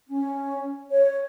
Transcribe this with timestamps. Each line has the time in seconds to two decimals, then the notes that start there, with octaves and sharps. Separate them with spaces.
0.08 C#4
0.91 C#5